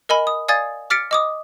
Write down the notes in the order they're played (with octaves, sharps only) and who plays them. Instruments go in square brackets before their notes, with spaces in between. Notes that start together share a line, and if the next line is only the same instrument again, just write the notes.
[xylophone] A#4 D#5 G#5 B5
D#6
D5 F5 G#5 D#6 G#6 A6
D6 F6 A6 B6 C#7 D7
D#5 D6 D#6